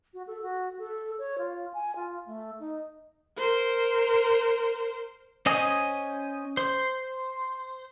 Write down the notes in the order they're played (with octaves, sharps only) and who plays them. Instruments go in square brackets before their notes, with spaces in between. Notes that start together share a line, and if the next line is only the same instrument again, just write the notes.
[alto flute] F#4
A4
F#4
A4
C#5
F4
G#5
F4
A3
D#4
[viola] A#4 C5
[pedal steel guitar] C#4 C5 D#5 G#5 D#6
C5